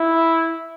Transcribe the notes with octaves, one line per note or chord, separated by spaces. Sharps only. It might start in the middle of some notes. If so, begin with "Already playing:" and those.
Already playing: E4